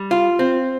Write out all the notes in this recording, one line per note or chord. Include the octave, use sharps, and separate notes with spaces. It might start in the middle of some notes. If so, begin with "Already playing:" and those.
Already playing: G3
F4
C4